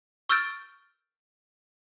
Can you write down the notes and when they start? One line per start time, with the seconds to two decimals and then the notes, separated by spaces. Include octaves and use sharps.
0.29 C#6 E6 F6 G6 A6 D7